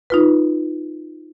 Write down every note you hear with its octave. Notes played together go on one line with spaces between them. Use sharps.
D#4 F4 B4